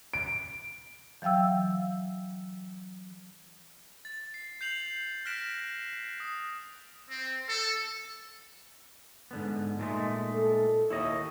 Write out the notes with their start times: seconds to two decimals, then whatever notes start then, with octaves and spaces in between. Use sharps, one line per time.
0.14 D7
1.22 E3 F#3 F5 G5 E6
4.05 A6
4.34 C7
4.61 G6 C7 F7 F#7
5.26 F6 F#6 A#6 B6 D7 E7
6.20 D#6
7.09 C4
7.48 A4
9.31 G#2 D3 B3
9.79 A#2 G#3 A3 D#4
10.34 A4
10.90 D#2 E4 C#5 D#5